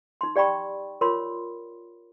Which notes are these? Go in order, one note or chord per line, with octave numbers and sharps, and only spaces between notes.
D#4 C6
G4 D5 G5 B5 C#6
F4 A#4 C#5 B5 C6